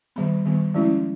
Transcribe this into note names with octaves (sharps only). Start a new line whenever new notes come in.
D#3 G3 B3 B5
D#3 G3 B3
F3 G#3 C#4 E4